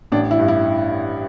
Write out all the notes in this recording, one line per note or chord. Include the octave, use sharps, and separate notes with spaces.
A1 D4
E4
G2
E4